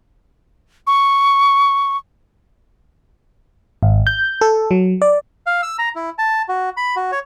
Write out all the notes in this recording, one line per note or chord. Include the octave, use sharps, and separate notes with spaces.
C#6
G#1
G6
A4
F#3
D5
F5
E6
A#5
E4
A5
F#4
B5
F#4
C#5